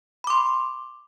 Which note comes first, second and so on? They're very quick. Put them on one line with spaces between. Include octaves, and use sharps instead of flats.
B5 D6 C6